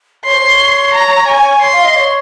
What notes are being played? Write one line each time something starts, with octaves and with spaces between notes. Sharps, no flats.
C#5 C6
C5
C#5
A#5
G#5
C6
F5
D#5
C#5